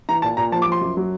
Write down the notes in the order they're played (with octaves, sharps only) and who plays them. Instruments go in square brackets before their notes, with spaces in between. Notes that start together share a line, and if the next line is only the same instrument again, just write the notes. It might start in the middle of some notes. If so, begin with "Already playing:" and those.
[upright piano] E3 A#5
A#2 A5
A#2 A#5
F3 A5
D6
F3 C6
F#2
F#3